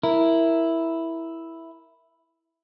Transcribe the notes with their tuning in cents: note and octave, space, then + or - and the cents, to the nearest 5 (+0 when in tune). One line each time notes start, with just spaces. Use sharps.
E4 +0 A#4 +0